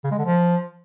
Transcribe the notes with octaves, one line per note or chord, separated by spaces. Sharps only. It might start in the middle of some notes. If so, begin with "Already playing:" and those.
C#3
G#3
D3
F3